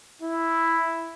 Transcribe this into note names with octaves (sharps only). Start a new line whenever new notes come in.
E4